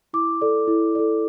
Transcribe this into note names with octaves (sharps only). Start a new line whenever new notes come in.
E4 D6
A4 D5
E4
A4 D5